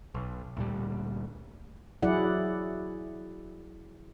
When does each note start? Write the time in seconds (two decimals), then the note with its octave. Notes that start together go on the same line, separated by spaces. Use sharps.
0.15 B1
0.57 D2 A#2 G3
2.03 F#3 E4 G#4 D5 F#5